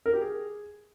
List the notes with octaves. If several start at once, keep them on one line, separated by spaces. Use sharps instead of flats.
A#4
G4
G#4